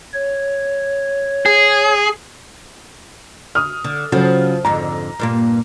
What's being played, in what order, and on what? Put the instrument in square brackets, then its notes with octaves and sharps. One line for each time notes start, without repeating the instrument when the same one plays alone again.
[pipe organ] C#5
[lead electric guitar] G#4
[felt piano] D#6 F6
[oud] D3
[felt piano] C#3 F#3 A4 [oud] F3
[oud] F2 G#2 D3 [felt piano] A#5
[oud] G2 A#2 A#3